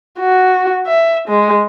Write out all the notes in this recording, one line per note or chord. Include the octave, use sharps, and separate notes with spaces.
F#4
E5
G#3